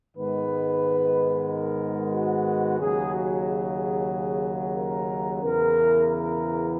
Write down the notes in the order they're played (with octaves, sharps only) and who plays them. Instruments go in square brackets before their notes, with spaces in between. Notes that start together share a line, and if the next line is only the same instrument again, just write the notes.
[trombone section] G#2 D#3 G#3 B3 B4
A#4
F#4
D#2 C#3 F#3 G#4
F#4
G#4
A#4
E2 C#3 E3 A#4
A#4